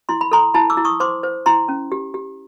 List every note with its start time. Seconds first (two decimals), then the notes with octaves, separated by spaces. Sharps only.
0.09 E4 C6
0.21 B5
0.31 A4 A#5 C6
0.54 E4 A5 B5
0.70 D6 E6
0.77 E4
0.85 C#6 D#6
1.00 C5 C6 D6
1.23 C5
1.46 E4 A#5 C6
1.68 C#4
1.92 G4
2.14 G4